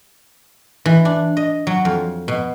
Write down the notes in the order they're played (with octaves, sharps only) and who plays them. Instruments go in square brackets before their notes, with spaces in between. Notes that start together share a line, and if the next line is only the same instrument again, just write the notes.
[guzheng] E3
D4
D#5
F#3
F2
B2